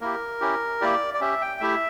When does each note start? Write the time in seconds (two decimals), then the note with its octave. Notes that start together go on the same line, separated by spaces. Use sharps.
0.01 A#3 E4 G4 A#4
0.41 C#4 E4 G4
0.81 A#3 E4 G4 D5
1.14 D5
1.21 C#4 G4 E5
1.41 G5
1.60 A3 E4 G4 E5